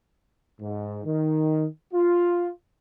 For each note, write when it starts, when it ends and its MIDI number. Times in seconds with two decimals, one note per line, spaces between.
0.61 1.01 44
1.05 1.66 51
1.93 2.49 65